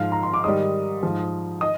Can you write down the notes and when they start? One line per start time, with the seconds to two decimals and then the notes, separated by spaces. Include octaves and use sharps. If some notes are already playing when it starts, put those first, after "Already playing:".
Already playing: G#2 F3 F5 F6
0.12 A#5
0.23 C6
0.34 D6
0.44 G#2 D#3 G3 D#5 D#6
1.03 G#2 F3
1.61 D#5 D#6